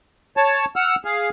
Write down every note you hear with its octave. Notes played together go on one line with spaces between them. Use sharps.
C#5 A5
F#5 E6 F6
G#4 F5